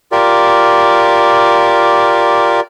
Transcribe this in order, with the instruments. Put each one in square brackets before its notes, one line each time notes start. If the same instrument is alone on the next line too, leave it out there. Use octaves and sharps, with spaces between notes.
[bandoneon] F4 G4 A#4 D5